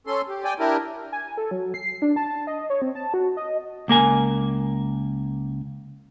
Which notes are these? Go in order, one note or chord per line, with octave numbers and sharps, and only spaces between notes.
C#4 A4 C6
G4
D5 G5 G#5
D4 E4 G4 A#4
G#5
A4
F#3
C7
D4
A5
D#5
C#5
C4
A5
F#4
D#5
C#2 A#3 A#4 G#5